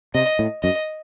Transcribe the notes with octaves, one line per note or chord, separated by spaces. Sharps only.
C3 D#5
A2
F#2 D#5